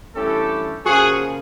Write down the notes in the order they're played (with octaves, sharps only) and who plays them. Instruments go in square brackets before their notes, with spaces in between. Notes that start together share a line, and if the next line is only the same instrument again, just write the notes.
[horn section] G2 E3 A3 C#4 E4 G4 A4
C#3 F3 A#3 F#4 G#4